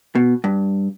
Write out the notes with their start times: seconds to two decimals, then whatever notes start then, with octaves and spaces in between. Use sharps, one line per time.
0.15 B2
0.44 G2